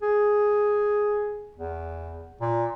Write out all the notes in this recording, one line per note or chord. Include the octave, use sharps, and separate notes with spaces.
G#4
E2
A#2